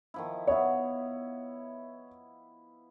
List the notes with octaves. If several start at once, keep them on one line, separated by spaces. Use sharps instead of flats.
D#3 F3 E4
B3 E4 C#5 E5